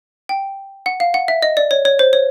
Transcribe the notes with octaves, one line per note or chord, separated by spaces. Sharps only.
G5
F#5
F5
F#5
E5
D#5
D5
C#5
C#5
C5
C#5